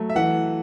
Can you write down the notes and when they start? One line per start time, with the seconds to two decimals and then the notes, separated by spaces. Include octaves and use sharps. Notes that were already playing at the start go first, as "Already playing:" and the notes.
Already playing: F#3 A3
0.10 E5
0.15 E3 F#5